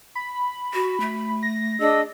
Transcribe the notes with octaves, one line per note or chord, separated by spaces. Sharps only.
B5
F#4
A3
A#6
D4 G#4 D#5 E6